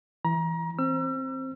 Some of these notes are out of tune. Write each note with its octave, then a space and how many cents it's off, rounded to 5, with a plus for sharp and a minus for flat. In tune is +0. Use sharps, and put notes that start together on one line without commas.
E3 +0 A#5 +30
C4 +10 E6 +40